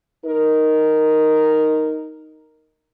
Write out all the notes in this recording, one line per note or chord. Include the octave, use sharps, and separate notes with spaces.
D#4 A#4